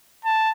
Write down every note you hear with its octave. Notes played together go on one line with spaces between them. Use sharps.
A5